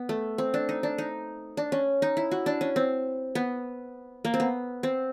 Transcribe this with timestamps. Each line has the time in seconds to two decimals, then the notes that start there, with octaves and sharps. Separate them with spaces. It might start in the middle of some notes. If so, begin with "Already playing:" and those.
Already playing: B3
0.09 A3
0.38 C4
0.54 D4
0.69 D#4
0.83 D4
0.98 D#4
1.57 D4
1.72 C#4
2.02 D#4
2.17 E4
2.31 F#4
2.46 D4
2.61 C#4
2.76 C4
3.35 B3
4.25 A#3
4.34 C4
4.40 B3
4.83 C4